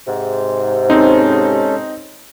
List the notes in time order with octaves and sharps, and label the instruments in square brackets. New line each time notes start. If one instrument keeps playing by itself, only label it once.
[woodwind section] G#2 C3
[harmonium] G#3 C#4 A4 [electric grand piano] C4 D#4